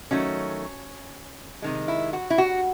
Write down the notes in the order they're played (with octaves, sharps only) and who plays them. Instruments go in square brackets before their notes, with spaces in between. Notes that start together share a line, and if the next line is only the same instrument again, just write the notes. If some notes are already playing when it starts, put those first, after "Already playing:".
[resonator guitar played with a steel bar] D#3 F#3 A3 C#4
C3 D#3 G#3
E4
F#4
E4
F#4